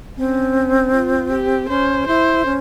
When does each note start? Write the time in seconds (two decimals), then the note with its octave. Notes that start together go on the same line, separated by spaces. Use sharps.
0.18 C4 C#4
0.94 F4
1.32 G4
1.69 C#4 C5
2.07 E4 C5
2.45 C#4